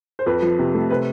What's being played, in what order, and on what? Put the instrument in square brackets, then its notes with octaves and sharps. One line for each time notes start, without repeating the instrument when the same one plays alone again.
[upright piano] C5
F2 B4
F3
C3
A3
C3 B4